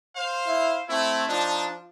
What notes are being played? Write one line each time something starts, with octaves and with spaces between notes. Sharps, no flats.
C5 F5
E4
A3 C4 E4
F3 D4 D#4